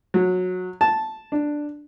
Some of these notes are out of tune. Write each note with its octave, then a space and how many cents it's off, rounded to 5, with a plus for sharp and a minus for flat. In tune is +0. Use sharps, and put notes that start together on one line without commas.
F#3 -20
A5 -5
D4 +5